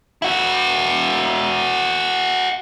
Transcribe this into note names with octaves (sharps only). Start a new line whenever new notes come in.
E4 F#4